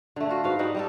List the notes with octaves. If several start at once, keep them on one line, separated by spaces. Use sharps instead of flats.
D3 A3
F4 F#4
G#2 F#4 B4 F5
G3 D#4 F#4 F#5
G3 D#4 A4